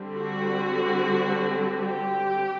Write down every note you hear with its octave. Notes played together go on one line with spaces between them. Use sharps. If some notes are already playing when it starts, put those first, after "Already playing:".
Already playing: D3 G3 C4
F#4
G4